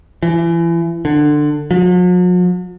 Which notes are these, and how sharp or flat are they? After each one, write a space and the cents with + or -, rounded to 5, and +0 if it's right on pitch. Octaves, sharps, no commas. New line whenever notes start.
E3 +30
D3 +20
F#3 -45